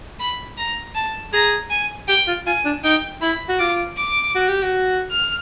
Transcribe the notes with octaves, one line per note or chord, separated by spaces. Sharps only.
B5
A#5
A5
G#4 A#5
G#5
G4 G5
F4
F4 G#5
D4
D#4 G5
E4 B5
F#4
F4 D6
D6
F#4
G4
F#4
F6